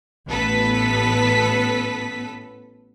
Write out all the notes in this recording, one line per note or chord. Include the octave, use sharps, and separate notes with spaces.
A1 B3 A4 B4 B6